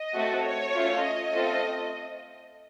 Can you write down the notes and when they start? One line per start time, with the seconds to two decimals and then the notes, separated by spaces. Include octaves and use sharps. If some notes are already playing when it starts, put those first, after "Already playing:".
Already playing: D#5
0.14 A3 C4 F#4 A4
0.44 C#5
0.74 A3 C#4 F4
1.03 D#5
1.33 A3 C4 F4 A4